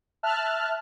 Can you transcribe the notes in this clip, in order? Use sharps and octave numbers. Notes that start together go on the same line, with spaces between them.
E5 A5 F6 F#6